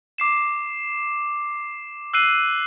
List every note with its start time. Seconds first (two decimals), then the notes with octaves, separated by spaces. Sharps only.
0.18 D6 C7 E7
2.14 E6 F#6 C7 D#7 F#7